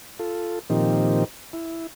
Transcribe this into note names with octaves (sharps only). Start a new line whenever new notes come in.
F4 A4
A#2 D#3 F3 C4 D#4 G4
E4